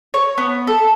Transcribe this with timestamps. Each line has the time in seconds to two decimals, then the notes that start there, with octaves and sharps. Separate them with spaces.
0.14 C#5
0.38 B3
0.67 A4